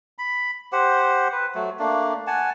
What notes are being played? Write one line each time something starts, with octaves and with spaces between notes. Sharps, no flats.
B5
G4 C5 F#5
B4
F#3 A3
A3 A#3 D4
F#5 G#5 A5